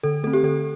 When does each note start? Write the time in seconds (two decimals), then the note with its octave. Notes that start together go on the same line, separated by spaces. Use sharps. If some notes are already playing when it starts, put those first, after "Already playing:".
0.03 D3 A4
0.23 A3 A4
0.27 C4
0.33 G4
0.43 D3 A4